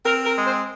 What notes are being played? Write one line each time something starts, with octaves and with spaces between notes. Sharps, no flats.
C4 A#4
A#4
G#3
C5